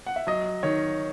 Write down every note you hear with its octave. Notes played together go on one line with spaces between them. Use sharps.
F#5
E5
F#3 D#5
D#3 C#5